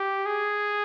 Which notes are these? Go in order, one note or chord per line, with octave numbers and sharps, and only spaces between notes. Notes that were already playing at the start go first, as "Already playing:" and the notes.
Already playing: G4
G#4